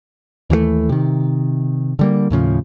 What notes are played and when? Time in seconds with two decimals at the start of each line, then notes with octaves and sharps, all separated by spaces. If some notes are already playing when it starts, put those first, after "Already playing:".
0.50 D#2 E3 F3 A3
0.89 C3 D#3
1.99 D3 G3 A#3
2.30 D#2 A2 C#3 F3